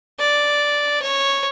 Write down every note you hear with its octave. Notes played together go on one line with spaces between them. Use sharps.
D5
C#5